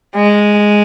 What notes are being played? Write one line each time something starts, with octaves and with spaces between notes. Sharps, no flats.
G#3